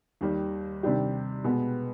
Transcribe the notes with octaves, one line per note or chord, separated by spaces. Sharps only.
D#2 D#3 G3
C3 D#3 G3 D4 G4
B2 G#3 B3